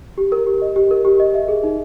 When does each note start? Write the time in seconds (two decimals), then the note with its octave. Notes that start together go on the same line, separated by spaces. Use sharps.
0.18 G4
0.32 A#4
0.47 G4
0.62 D#5
0.76 G4
0.91 A#4
1.05 G4
1.20 D#5
1.34 E5
1.48 G#4
1.63 D#4